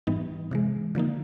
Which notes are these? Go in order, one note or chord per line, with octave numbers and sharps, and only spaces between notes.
G#2 E3 G3 B3 D#4
C3 E3 G#3
D3 F3 A#3 D#4